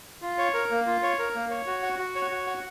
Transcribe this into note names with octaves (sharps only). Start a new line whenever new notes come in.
F4
C#5
A#4
A#3
F4
C#5
A#4
A#3
C#5
F#4
F#5
F#4
C#5
F#4
F#5